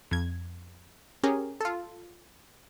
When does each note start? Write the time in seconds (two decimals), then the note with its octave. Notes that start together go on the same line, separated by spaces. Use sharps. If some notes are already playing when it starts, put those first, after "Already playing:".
0.11 F2 G#6
1.23 C#4 G4 G#4 A#4
1.61 F4 A4